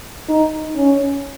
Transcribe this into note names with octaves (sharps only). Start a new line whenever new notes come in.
D#4
C#4